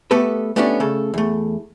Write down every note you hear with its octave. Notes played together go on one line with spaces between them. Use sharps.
A3 B3 G4 A4 B4
A3 B3 C#4 D4 F#4 G4
C#3 A3 A4
E2 A3